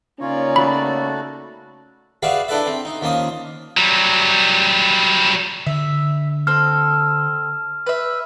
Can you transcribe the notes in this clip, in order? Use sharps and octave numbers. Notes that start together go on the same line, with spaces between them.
C#3 A#3 C#4 D#4 F4 C#5 D5
A3 F#4 A4 B5
F#4 G#4 B4 D5 E5 F5
D4 E4 A4 B4 D5 E5
C4
D#4
D#2 F3 A#3 C#4 D#6
F#3 G3
D3 E5
C4 A4 F6
B4 E5